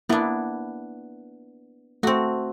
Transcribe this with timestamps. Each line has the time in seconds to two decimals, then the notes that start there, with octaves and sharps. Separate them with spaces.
0.09 A#3 B3 D4 E4
2.03 A3 C4 F#4